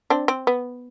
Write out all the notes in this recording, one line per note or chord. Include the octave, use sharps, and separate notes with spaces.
C4 D4
C4
B3